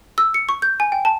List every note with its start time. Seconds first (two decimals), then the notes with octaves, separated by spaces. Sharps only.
0.18 E6
0.34 C#7
0.49 C#6
0.62 G6
0.80 G#5
0.92 G5
1.05 A5